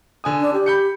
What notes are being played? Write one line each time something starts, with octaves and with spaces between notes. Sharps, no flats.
D3 G#5 D#6
D4
G4
B5 G6 C#7